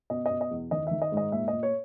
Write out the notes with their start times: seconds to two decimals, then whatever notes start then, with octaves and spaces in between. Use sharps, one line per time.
0.10 B2 D#5
0.26 B2 D#5
0.41 D#5
0.51 E2
0.71 D#3 D#5
0.87 D#3 E5
1.02 D#5
1.12 G#2
1.17 D#5
1.32 A#2 E5
1.48 A#2 D#5
1.63 C#5